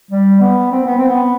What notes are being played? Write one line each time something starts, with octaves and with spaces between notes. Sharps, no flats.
G3
B3
C4
B3
C4
B3